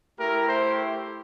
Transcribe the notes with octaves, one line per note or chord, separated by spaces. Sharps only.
A3 E4 G4 A#4
C5